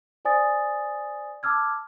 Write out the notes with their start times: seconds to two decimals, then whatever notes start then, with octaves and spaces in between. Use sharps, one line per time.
0.25 C5 D5 G#5 D#6 A6
1.43 A5 D6 E6 F6 G#6